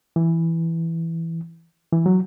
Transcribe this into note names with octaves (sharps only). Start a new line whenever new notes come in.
E3
E3
F#3